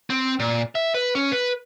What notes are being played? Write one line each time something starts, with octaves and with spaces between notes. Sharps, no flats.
C4
A#2
E5
B4
C#4
B4